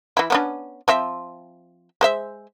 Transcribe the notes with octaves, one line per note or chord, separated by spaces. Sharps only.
E3 E4
B3 C#4 D4
F3 C4 E5
G#3 C5 E5